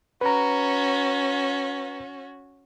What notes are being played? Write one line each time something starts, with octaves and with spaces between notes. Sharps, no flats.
C#4 F#4 B4 A#5